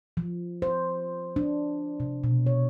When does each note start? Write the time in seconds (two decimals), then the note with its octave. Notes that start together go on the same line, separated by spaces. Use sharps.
0.17 F3
0.62 C5
1.36 D4
2.00 C3
2.24 B2
2.46 C#5